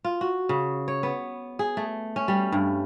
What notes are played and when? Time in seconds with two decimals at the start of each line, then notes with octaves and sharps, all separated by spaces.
0.05 F4
0.21 F#4
0.49 C#3
0.88 C#5
1.03 B3
1.59 G#4
1.77 A3
2.16 C#4
2.28 G3
2.52 G2